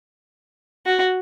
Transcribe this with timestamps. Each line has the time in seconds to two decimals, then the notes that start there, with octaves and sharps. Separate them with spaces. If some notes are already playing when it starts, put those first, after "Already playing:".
0.86 F#4